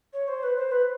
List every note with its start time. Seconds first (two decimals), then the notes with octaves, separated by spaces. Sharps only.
0.13 C#5
0.28 C5
0.43 B4
0.57 C5
0.71 B4